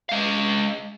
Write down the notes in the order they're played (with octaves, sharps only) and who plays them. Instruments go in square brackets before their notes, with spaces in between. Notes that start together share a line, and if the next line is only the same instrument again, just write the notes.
[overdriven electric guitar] G#3 F5